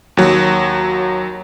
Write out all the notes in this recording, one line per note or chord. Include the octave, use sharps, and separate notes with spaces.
D#2 F#3